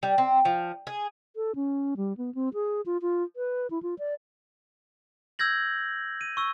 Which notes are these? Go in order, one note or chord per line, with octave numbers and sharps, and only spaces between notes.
G3
C4
F3
G#4
A4
C#4
G3
B3
C4
G#4
F4
F4
B4
E4
F4
D5
E6 G6 G#6 A#6 F#7
D#7
C#6 E6